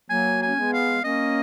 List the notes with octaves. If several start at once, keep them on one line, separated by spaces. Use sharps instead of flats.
F#3 A#3 G#5
G#5
C#4
G#3 B3
F5
A#3 C#4 D#5